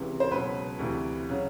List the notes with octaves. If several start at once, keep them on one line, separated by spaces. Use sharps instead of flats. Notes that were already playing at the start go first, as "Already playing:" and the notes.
Already playing: C#2 C3 E3
C5
C#2 B2 F#3 B4
D2 C3 E3
C#3 F#3